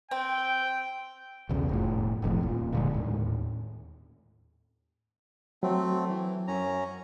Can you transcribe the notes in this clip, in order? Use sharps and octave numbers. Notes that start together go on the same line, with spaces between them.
C4 G5
B1 E2 C#3
F1 A2
F1 B1 F2 A2
D#1 A#2
A#2 D3 G#3
D#2 A2
F#3 A3 C4
E3
F#2 C#4 A#5